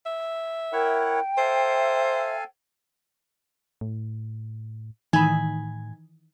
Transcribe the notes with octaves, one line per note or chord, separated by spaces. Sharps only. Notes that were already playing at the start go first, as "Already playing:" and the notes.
E5
E4 A#4 C#5 F#5 G5
A4 C5 E5 F5 G#5
A2
A2 D#3 E3 D#4 G#5 B5